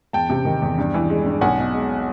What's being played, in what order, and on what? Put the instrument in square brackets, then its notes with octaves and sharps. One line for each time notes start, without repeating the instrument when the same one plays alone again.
[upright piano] E2 G5 A5
C3
D#3
E2
G2
E3
G#3
G2
B1 F#5 G#5
B2
G#3